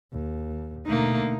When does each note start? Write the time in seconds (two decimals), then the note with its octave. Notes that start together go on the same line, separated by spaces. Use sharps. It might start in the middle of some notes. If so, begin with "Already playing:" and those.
0.12 D#2
0.86 B2 D3 A3 A#3 D#4